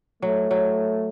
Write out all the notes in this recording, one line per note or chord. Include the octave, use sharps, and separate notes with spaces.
F#3 A3
F#3